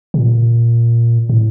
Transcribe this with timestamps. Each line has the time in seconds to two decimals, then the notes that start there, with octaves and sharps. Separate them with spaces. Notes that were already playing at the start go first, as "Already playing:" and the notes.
0.14 C3
0.20 A#2
1.30 A2